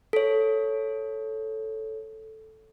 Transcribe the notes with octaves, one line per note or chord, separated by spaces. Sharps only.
A4 C#5